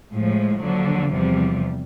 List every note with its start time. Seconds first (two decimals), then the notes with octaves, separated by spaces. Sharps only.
0.13 A2 F3 G#3
0.63 D#2 D3 F3 F#3
1.12 E2 C3 F3 G3